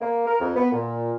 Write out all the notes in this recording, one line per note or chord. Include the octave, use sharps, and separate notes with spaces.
A#3
A#4
F2
B3
A#2